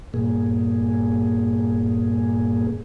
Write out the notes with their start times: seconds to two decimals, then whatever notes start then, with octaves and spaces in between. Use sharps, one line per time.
0.14 G2 A#2 A#3 G#4